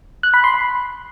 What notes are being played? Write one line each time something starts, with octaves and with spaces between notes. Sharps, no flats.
F#6
B5
C6
B5